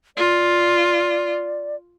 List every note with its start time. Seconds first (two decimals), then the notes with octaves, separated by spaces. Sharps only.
0.17 F4 D5